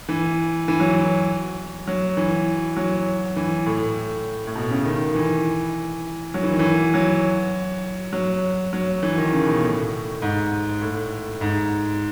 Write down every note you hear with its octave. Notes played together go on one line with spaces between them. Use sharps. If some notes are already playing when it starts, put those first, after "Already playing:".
E3
E3
F#3
E3
F#3
E3
F#3
E3
A2
A2
B2
C#3
D#3
E3
F#3
E3
D#3
E3
F#3
F#3
F#3
E3
D#3
C#3
B2
A2
G#2
A2
G#2